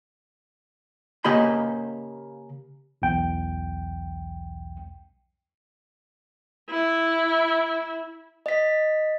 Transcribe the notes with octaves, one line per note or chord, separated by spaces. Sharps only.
C#3 A#3 G4 D#5 B5
B1 E2 G5
E4
D#5 B6